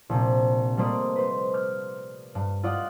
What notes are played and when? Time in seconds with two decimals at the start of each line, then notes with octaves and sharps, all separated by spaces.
0.09 A#1 C3
0.77 G3 A3 A#3 C5 D5 D#5
1.16 B4 C5
1.53 D6 F6 G6
2.35 G2
2.63 F4 D5 D#5 F#5